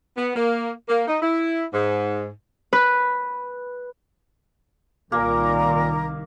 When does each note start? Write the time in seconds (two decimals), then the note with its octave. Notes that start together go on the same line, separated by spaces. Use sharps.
0.17 B3
0.35 A#3
0.88 A#3
1.07 D#4
1.22 E4
1.73 G#2
2.73 B4
5.12 C2 A#2 D#3 A#3 A#4